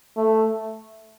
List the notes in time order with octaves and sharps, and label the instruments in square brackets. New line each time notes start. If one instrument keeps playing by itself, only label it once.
[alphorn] A3